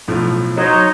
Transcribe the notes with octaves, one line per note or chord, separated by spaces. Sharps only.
B1 A2 F3
F#3 D#4 C5 C#5 D#5